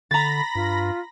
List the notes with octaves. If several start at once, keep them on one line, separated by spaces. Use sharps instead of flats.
D3 A#5 B5 A6 A#6
G2 F4